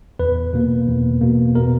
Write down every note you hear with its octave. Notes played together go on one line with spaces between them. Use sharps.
E2 B4
B2 A#3
E2
B2 A#3
B2 A#4